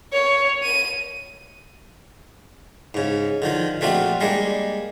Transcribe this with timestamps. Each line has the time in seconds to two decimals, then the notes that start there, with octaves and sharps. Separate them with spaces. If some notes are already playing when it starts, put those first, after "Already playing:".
0.13 C#5
0.63 D#7
2.94 G#2 C#3
3.42 D3 D#3 F3
3.81 A#1 A3 C4 D4 F4 F#4
4.20 G3 G#3 A#3 D4